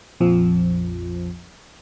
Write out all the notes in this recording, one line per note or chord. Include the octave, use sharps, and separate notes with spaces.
A#1 F2 F3